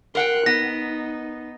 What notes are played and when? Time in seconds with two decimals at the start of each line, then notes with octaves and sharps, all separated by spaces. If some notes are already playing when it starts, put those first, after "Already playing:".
0.15 A#4 F#5 G5 C6 F#6
0.46 B3 D#4 A#6